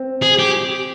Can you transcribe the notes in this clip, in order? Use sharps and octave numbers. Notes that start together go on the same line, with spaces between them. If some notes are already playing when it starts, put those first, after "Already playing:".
Already playing: C4
G#4
G4